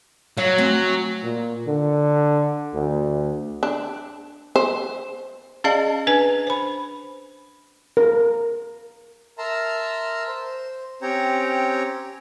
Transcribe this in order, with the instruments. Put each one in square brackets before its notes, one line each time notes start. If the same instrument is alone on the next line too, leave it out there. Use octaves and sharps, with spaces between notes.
[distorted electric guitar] F#3 [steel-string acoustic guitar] F5
[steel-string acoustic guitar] A3 C4 G#5
[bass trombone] A#2
D3
D2
[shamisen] D4
C5
[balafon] C#4 G#4 D5 D#5 F5 A5
D4 B4 G#5
C5 B5
[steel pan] A#4
[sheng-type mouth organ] A#4 E5 A5 A#5 C6
C5
C4 C#4 G4 C#5 G5 A#5